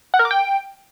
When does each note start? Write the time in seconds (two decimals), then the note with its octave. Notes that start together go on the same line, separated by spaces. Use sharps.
0.14 F#5
0.19 A#4
0.25 D6
0.31 G5